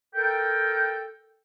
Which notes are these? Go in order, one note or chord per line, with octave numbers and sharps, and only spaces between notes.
A4 A#4 G5